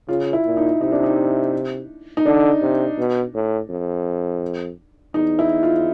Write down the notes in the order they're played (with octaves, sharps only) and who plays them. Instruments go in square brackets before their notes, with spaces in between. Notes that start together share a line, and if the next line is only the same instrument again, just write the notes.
[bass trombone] C#3 [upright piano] F4
[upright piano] E4
[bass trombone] A#2
[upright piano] D#4
[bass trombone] C3 [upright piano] D#4
[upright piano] D4
D#4
D#4
[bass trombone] D3 [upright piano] D4
[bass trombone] C3
B2
A2
F2
[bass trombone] E2 [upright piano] D#4
[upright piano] E4
F4